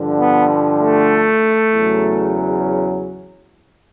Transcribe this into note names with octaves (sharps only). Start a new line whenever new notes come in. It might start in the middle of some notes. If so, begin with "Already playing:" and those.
Already playing: G2 D3 F3
B3
A3
E2 C#3 F#3